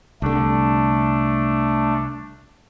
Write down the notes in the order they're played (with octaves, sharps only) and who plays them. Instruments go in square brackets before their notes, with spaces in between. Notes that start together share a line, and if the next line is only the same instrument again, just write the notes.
[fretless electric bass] C2 D3 [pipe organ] A3 D4